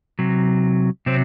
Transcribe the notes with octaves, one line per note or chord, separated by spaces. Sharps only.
C3 F#3
C3 F#3 C4